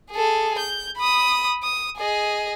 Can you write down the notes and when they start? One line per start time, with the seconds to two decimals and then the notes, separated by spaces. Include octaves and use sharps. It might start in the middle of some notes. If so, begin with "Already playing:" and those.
0.11 G#4 A4
0.59 G6
0.97 B5 D#6
1.63 D#6
1.97 G#4 D#5